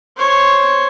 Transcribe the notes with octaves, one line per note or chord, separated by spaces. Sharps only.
C5 C#5